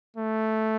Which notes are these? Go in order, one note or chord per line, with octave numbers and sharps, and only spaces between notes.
A3